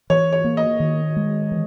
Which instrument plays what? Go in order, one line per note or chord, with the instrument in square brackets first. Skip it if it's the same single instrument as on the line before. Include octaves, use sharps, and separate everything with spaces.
[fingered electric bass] E3 [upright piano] C#5
[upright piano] C#5
[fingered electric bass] A#3
[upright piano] D#5
[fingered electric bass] D#3
G#3
E3